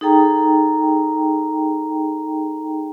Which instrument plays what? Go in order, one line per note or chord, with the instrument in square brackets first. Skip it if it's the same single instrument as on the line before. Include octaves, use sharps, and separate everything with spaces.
[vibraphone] D#4 G#4 A4 G5 A#5